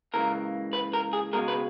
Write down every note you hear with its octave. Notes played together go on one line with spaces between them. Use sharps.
C#2 C#3 E3 A#3 A#4
B4
A#4
G#4
C#2 B2 G#3 A#4
B4